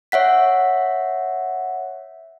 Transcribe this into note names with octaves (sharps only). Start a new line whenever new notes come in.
C#5 E5 F#5 B6